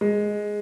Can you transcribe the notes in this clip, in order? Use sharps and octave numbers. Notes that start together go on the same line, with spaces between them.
G#3